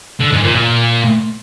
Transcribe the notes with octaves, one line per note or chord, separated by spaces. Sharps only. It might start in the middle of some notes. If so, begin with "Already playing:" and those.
D3
G#2
A#2
A#2